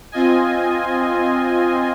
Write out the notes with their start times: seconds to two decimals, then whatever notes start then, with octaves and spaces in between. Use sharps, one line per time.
0.12 C4 F4 D#5 G#5